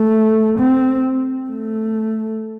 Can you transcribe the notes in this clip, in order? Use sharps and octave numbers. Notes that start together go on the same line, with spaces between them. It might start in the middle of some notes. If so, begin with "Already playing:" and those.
Already playing: A3
C4
A3